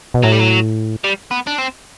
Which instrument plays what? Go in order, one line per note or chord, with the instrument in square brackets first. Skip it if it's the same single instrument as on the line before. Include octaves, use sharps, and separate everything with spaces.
[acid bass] B2
[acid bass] A2 [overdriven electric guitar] F#3
[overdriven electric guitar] G3
F#3
G3
B3
D4
C4